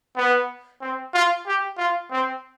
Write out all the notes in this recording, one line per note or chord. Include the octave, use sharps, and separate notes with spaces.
B3
C4
F4
G4
F4
C4